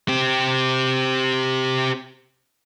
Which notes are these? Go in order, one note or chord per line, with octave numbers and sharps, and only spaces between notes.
C4 G4